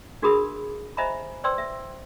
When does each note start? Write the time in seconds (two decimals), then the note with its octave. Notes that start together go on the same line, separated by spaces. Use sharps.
0.22 D4 F#4 G#4 A#4 B5 D#6
0.97 C5 D#5 E5 G#5 A#5 B5
1.44 B4 C5 D5 G5 C6 E6
1.58 E5